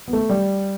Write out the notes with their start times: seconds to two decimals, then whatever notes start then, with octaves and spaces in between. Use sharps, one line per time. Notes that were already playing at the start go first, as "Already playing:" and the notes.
0.08 B3
0.13 A3
0.29 G3